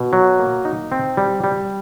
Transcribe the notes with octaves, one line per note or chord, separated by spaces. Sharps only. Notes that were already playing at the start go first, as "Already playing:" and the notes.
Already playing: B2
F#3
A#3
D#4
C4
G3
G3